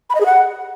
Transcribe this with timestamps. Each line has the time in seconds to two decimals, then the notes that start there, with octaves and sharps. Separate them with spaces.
0.10 B5
0.15 D#5
0.20 G#4
0.26 F#5